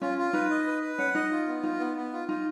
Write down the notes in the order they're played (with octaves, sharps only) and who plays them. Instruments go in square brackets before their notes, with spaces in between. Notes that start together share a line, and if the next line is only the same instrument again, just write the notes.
[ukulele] C#4 [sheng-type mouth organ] F4
[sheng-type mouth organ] F4
[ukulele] D#4 [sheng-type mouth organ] B4
[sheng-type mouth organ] D#5
B4
B4
[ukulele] C#4 [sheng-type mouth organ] F#5
[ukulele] D#4 [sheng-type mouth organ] D#5
[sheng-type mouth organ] F4
B3
[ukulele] D#4 [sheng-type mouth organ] F4
[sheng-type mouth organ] B3
B3
F4
[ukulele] D#4 [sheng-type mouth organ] F4